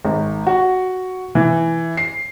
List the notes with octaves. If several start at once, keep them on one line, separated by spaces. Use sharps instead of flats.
G#1
F#4
E3
C7